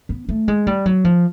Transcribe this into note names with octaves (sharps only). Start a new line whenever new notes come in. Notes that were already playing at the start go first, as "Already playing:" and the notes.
B3
A3
G#3
G3
F#3
F3